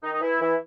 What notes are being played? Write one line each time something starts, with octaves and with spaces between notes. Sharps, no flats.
D#3 D#4
D#4
E3 E4
E3 E4